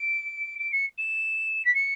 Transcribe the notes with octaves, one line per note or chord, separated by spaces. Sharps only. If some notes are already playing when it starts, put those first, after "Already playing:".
Already playing: D7
D7
C#7
E7
B6
C#7